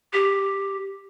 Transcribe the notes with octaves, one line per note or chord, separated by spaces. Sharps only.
G4